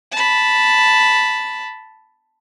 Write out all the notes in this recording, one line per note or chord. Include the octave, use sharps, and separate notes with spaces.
A5 B5